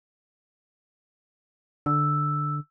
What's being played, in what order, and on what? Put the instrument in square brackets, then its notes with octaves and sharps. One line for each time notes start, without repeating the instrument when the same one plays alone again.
[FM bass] D3 [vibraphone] E6